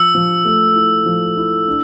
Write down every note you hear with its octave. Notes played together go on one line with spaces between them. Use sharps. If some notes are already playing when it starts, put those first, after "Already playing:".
Already playing: F3 E6
F3
A3
E4
F3
E4
D4